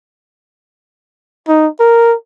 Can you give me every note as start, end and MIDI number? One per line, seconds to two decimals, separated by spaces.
1.48 1.67 63
1.80 2.14 70